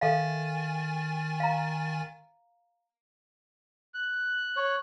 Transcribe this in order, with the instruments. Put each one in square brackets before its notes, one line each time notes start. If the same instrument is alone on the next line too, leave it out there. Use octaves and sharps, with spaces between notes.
[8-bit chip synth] D#3 G#5 A6 [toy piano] A4 E5 F5
[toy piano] F5 A#5
[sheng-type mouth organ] F#6
[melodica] C#5